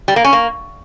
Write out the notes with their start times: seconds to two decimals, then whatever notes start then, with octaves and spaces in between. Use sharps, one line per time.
0.08 G3
0.16 A#3
0.24 C#4
0.33 A#3